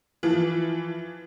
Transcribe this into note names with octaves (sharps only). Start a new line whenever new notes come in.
E3 F3